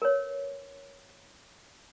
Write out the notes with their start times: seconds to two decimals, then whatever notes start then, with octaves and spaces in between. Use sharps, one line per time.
0.02 A#4 B4 C#5